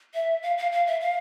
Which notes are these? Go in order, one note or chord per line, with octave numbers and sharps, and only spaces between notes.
E5
F5
F5
F5
E5
F5